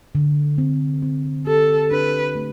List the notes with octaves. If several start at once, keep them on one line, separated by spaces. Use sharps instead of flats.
D3
C4
C4
G4 A4
D4 B4
A3